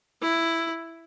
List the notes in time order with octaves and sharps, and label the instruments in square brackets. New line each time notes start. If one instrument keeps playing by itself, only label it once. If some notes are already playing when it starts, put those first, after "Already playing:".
[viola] E4